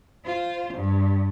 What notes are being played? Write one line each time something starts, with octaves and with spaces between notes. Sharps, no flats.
F4 C5
G2